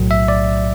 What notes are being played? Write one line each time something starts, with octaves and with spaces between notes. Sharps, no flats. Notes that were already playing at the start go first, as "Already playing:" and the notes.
Already playing: B1 A2 F#3
E5
D5